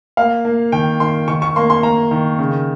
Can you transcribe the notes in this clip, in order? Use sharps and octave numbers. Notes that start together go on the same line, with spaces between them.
A#3 F5
A#3
D#3 G5
D#3 C6
D#3 C#6
C#6
A#3 C6
C6
A#3 A#5
D#3
C#3